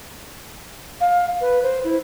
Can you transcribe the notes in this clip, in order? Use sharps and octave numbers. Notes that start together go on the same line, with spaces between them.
F5
B4
C5
E4